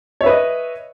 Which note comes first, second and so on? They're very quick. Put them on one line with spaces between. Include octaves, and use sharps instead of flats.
C#5 E5 B4 D#5